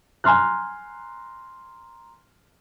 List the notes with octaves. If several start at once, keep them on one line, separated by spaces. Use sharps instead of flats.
G#5 A#5 C6 F6 F#6